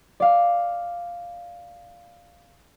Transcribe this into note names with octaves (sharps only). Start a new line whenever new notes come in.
D5 F5